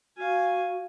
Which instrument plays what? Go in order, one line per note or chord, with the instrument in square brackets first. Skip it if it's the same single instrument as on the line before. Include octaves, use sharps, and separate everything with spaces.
[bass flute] F#4 [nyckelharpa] F5 G#5